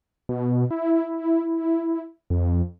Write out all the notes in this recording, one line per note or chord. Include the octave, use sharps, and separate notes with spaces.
B2
E4
F2